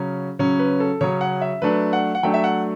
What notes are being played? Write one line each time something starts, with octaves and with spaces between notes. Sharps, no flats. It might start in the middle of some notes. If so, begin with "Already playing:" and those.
Already playing: C#3 F#3 C#4
C#3 F#3 C#4 C#5
B4
A4
C#3 F#3 C#4 C#5
F#5
E5
F#3 A3 D4 B4
F#5
F#5
F#3 A3 D4 G5
E5
F#5